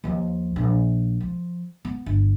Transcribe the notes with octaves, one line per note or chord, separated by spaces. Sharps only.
D#2 F3
A#1
F3
B3
G1